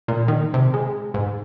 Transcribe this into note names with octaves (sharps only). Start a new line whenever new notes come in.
A#2
D#3
C3
G#3
G#2